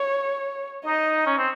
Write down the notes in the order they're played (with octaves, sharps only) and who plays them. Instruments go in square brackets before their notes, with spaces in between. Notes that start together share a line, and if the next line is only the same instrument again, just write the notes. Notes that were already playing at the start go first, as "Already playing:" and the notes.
Already playing: [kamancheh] C#5
[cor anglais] D#4 [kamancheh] D#5
[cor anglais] C#4
C4